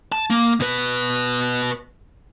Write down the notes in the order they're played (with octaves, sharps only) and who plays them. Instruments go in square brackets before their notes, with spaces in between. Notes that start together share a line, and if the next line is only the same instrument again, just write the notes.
[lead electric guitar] A5
A#3
B2 B4